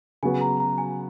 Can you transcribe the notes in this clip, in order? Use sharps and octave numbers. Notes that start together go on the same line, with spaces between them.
C#3 F#3 B3 F#4 G#5
A#5
A#5
G#5